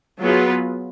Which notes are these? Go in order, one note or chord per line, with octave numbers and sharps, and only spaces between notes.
F#3 B3 F4 G#4 B4